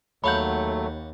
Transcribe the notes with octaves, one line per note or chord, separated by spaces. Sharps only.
D#2 F#3 A3 C#5 F5 F#5 B5 G6